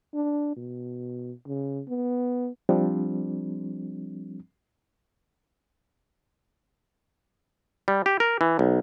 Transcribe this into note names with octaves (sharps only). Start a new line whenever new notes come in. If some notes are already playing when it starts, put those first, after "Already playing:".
D4
B2
C#3
B3
F3 G3 C4 D4
G3
G4
A#4
E3
B1